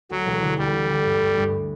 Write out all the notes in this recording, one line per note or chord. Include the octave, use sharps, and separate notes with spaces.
D2 F#3
E1
D3
D2 G3
D2
D3
G2
G2
G2